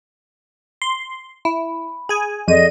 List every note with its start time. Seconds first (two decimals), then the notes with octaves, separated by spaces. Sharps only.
0.82 C6
1.45 E4 B5
2.09 G#4 G#5
2.48 F2 G#4 A4 D5 D#5 D#7